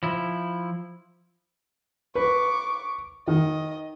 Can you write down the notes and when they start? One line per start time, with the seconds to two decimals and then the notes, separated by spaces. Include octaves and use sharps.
0.03 F3 E4
2.15 B4 C#6 D6
3.28 D#3 D#5